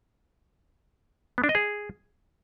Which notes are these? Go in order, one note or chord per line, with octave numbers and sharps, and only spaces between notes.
B3
D4
D#5
G#4